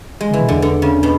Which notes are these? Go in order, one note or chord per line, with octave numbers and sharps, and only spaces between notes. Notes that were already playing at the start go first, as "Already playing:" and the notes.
G#3
C#3 E3
B2
E2 D3
D3
C#3
B2